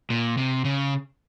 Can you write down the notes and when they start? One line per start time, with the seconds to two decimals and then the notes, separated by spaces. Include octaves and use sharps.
0.10 A#2
0.37 C3
0.65 C#3